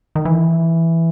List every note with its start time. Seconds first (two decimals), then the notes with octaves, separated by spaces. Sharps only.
0.15 D#3
0.25 E3